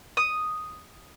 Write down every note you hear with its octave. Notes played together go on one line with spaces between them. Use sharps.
D#6